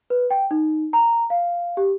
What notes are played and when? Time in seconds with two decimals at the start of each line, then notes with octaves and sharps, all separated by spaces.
0.10 B4
0.31 G5
0.51 D#4
0.93 A#5
1.30 F5
1.77 G4